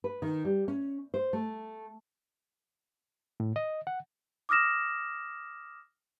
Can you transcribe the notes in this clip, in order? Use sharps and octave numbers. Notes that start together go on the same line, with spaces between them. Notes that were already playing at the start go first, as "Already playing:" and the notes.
B4
D#3
G3
C#4
C5
A3
A2
D#5
F#5
D6 D#6 F6 A#6 E7